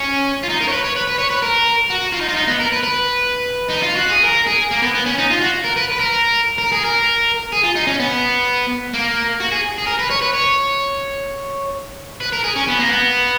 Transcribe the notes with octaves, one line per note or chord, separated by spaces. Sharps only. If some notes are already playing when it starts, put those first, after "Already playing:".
Already playing: C#4
F4
D#4
A#4
C#5
B4
C#5
B4
B4
C#5
B4
A#4
F#4
F4
D#4
F4
D#4
B3
A#4
B4
B4
D#4
F4
F#4
G#4
A#4
G#4
A#3
B3
B3
C#4
D#4
F4
F#4
A#4
B4
B4
A#4
A#4
G#4
A#4
G#4
F4
D#4
C#4
B3
A#3
F#4
G#4
G#4
A#4
B4
C#5
B4
C#5
B4
A#4
G#4
C#4
B3
A#3
B3